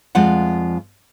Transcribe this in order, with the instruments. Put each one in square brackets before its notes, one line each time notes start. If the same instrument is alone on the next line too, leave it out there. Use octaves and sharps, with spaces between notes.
[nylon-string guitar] F2 F3 G#3 F4 D5 F#5